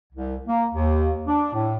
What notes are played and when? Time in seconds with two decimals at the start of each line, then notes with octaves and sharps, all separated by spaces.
0.13 C2
0.46 A#3
0.73 D#2
1.26 D4
1.53 A2